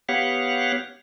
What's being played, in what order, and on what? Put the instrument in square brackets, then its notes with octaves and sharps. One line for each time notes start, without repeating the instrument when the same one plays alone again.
[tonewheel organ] B3 G4 C#5 F5 F#5